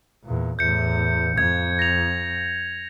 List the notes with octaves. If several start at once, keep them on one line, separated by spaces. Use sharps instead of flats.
E2 A#2
E2 A2 G6 C#7
F2 G#6
A#6 F7